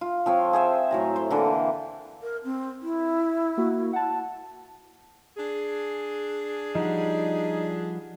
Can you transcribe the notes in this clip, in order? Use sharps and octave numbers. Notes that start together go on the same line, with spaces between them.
F4
F3 C4 C#5
G#4 C5 E5
A2 F#3 A#5
C5
D3 E3 A#3 A4
A#4
C4
E4
A#3 F#4
F#5 A5
D4 G#4
F3 G3 D#4 F#4